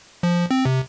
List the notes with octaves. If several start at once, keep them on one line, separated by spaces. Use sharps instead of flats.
F3
C4
C3